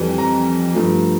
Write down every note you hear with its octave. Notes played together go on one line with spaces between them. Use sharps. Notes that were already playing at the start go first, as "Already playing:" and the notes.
Already playing: F2 E3 G3
A#5
G2 F3 A3